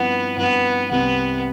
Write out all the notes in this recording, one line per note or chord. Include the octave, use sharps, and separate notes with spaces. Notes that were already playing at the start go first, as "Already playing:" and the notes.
Already playing: G2 F3 B3 C4 E4
G2 F3 B3 C4 E4
C2 C3 G3 B3 C4